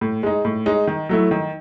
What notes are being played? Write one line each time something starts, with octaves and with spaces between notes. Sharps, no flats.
A2
G#3 D#4
A2
G#3 D#4
D#3
F#3 A3 E4
D#3